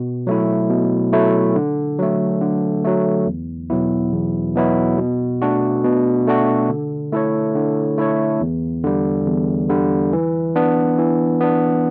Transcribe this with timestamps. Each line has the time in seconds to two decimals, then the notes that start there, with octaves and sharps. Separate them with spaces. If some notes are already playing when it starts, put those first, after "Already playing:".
Already playing: B2
0.27 F#3 A3 E4
0.70 B2
1.13 F#3 A3 E4
1.55 D3
1.99 F#3 A3
2.41 D3
2.84 F#3 A3
3.26 E2
3.70 B2 F#3 B3 E4
4.13 E2
4.55 B2 F#3 B3 E4
4.98 B2
5.42 A3 D4 F#4
5.84 B2
6.27 A3 D4 F#4
6.69 D3
7.12 A3 E4 A4 C#5
7.55 D3
7.98 A3 E4 A4 C#5
8.40 E2
8.84 D3 G3
9.27 E2
9.69 D3 G3
10.13 E3
10.56 B3 D4
10.98 E3
11.40 B3 D4